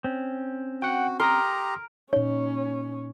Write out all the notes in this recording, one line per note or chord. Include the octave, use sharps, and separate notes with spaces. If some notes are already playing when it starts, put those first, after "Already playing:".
C4 C#4
F#4 F#5 G5
G4 A#4 A#5 C6 D#6 A#6
A#2 C#4 D#4 C#5